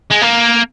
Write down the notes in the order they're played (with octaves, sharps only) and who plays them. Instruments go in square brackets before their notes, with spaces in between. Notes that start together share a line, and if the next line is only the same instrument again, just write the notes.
[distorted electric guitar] G#3
A#3